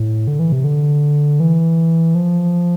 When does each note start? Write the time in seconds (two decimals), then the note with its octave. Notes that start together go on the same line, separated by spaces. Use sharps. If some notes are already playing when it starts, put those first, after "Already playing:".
Already playing: A2
0.27 D3
0.39 E3
0.52 C3
0.64 D3
1.40 E3
2.15 F3